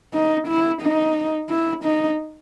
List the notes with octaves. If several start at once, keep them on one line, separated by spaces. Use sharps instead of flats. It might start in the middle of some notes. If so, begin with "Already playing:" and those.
D#4
E4
D#4
E4
D#4